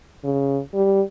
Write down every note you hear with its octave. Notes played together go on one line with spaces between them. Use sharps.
C#3
G3